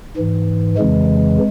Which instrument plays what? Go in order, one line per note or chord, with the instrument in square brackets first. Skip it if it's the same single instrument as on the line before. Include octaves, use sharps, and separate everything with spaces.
[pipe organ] G#2 E3
F2 C#3 E3 G#3